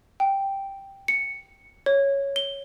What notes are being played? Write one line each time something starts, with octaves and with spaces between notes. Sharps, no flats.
G5
C#7
C#5
G7